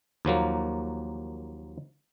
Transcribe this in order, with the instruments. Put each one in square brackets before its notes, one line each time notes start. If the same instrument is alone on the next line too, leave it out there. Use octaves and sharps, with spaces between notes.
[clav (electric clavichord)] D#2 F3 F#3 A#3